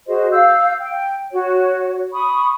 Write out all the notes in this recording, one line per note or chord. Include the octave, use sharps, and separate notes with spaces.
F#4 G#4 C5 D#5
F5 E6 G6
G5
F#4 C#5
B5 C#6 D#6